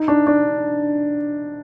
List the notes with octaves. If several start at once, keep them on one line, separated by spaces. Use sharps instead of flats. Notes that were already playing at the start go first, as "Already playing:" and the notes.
Already playing: D#4
D4
D4